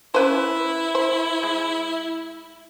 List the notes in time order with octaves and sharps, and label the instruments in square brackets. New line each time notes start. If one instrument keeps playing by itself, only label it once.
[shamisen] C#4 B4 C5 [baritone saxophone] E4
[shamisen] C5
G#3